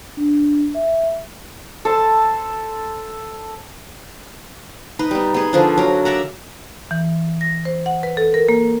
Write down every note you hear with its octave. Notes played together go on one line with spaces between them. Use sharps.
D4
E5
A4 C5 A5
D#4 B4
G3 B3
B3 G#4
D3 F3 D4
F#3 A#4
D5 E5 F#5 A#5
E3
A#6
C5
F#5
B4
A4
A#4
A#3